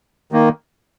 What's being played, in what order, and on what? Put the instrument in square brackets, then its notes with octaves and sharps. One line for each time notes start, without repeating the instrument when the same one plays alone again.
[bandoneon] D#3 A#3